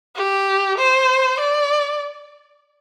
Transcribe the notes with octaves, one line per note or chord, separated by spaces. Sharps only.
G4
C5
D5